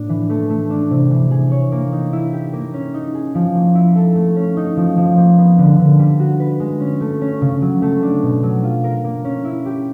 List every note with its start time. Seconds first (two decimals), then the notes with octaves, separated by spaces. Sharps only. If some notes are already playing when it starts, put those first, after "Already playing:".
Already playing: A2 A#3 D4
0.09 E3
0.29 A3
0.50 A3
0.70 D4
0.91 C3
1.10 E3
1.31 G#4
1.52 C#5
1.72 A#3
1.92 D#4
2.13 E4
2.33 G4
2.53 A#3
2.74 C#4
2.94 D#4
3.14 G#4
3.35 F3
3.55 A#3
3.75 E4
3.96 A4
4.16 A3
4.36 C#4
4.57 D#4
4.77 F3
4.97 F3
5.17 A#3
5.38 B3
5.58 D3
5.79 D3
5.99 G3
6.20 F#4
6.40 B4
6.60 G#3
6.80 C#4
7.01 A3
7.21 C#4
7.41 C#3
7.62 F#3
7.82 A3
8.02 D4
8.23 B2
8.43 F#3
8.63 F4
8.84 A#4
9.04 A#3
9.24 C#4
9.45 E4
9.65 G4